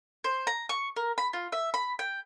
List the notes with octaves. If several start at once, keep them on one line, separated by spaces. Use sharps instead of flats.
C5
A#5
C#6
A#4
B5
F4
E5
B5
G5